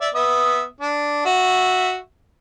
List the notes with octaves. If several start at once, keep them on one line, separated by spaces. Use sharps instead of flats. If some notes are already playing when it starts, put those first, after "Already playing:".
D5 E5
B3 E5 D#6
D4
F#4 E5